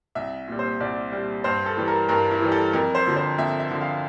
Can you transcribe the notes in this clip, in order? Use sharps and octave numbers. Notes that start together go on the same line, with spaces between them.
C2 E5
A#2 G3
C5
C2 D5
A#2 G3
G2 C5
A4
E3 G3
A#4
G2 A#4
E4
E3 G3
A4
F2 A#4
C5
D3 F3
C5
F2 E5
E5
D3 F3
F5